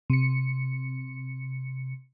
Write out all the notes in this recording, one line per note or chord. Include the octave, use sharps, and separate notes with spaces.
C3 C#7